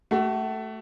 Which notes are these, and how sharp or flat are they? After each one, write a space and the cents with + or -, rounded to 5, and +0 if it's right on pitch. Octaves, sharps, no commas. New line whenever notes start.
A3 +0 F#4 +35